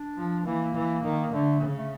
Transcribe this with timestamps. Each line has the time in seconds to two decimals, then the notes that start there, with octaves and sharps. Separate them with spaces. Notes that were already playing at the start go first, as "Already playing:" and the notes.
Already playing: D4
0.17 F3
0.46 E3 A#3
0.75 E3
1.04 D#3
1.33 D3 A3
1.61 C#3
1.76 A3